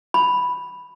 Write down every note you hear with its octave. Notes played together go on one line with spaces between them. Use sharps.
B5